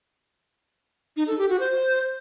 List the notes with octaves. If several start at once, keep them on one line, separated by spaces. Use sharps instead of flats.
D#4
A4
G4
F#4
C5